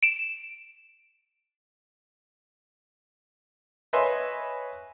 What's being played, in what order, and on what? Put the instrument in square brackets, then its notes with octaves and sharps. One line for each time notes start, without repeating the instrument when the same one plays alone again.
[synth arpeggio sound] D7 E7
[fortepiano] B4 C#5 D#5 E5 G#5 C6